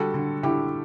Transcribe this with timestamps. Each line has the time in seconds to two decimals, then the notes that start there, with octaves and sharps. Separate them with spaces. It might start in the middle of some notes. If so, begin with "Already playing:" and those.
Already playing: D3 G3 F#4 A4
0.14 D3
0.43 D3 E4 G4